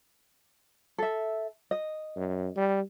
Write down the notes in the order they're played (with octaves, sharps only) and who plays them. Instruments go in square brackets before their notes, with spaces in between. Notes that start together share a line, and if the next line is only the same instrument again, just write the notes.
[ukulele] A4 E5
D#5
[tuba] F#2
G3